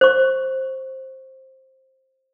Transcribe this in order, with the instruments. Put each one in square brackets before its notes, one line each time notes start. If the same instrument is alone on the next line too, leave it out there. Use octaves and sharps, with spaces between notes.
[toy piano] C5 C#6